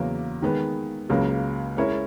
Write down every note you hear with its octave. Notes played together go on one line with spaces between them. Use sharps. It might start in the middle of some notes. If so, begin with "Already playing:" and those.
Already playing: E2 C#3 F#3 A#3
D#3 G#3 B3
C#2 C#3 F#3 A#3
G#3 C#4 E4 A#4 C#5